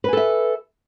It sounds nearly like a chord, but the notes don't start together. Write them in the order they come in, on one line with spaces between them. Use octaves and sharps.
B4 G#5 A4 E5